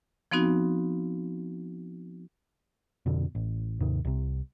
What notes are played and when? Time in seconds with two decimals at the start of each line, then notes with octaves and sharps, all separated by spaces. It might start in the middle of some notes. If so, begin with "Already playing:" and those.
0.31 F3 B3 C4 D#4 F#4
3.06 F2 B2 D3
3.35 A1
3.80 D#2 G#2 C3 D#3
4.05 C2 C3